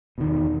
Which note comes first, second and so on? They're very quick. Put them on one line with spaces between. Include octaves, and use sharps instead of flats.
B2 D#3 E2